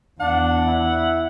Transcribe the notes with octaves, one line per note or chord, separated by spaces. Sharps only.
E2 D4 F#5
E4